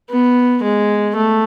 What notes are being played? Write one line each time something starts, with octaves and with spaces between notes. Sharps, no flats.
B3
G#3
A3